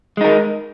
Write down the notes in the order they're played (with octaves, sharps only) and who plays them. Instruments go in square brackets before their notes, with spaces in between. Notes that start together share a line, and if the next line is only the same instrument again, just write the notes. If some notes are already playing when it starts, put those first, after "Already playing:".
[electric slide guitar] G#3
D#4
A#4